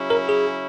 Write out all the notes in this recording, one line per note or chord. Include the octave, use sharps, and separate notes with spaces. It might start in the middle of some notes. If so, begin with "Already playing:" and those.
Already playing: C#3 F#3 C#4 E4
A#4
G#4